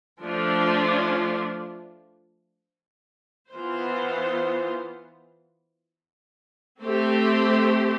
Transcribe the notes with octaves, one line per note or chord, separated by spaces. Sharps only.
F3 A3 D4 F4
E3 B3 F4 C5
A3 C4 G4 C5